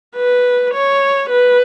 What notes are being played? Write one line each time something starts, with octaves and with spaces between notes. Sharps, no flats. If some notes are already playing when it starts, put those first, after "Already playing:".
B4
C#5
B4